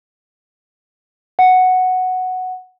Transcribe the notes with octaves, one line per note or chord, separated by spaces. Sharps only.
F#5